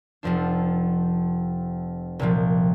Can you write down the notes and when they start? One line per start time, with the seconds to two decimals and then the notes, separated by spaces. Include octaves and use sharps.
0.23 F1 F2 F3 D4
2.19 C2 A#2 F3